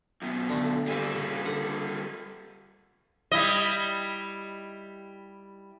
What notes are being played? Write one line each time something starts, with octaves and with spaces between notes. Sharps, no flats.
F#2 B2
D3 A3 D4
G3 A#3 D5 E5 G#5
C#3 G#4
D3 D5 F#5
G3 E4 D#5